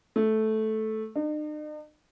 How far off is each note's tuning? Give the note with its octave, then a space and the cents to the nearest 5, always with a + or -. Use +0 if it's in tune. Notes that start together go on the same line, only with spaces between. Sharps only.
A3 -10
D#4 -45